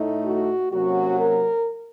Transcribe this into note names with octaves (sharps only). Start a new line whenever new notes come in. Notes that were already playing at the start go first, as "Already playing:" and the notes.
Already playing: A2 A3 D#4
F#4
C3 F#3 A#3 C#4 F#4
A#4